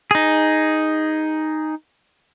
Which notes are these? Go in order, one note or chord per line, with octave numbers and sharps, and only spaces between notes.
D#4 G#4